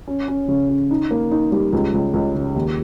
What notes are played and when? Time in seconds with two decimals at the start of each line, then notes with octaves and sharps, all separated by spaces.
0.08 C#4
0.28 C#4
0.48 C#3
0.69 C#4
0.91 D#4
1.11 A#3
1.31 D#4
1.52 G3
1.73 C#2
1.94 C#2
2.14 C#2
2.35 C#3
2.56 D#2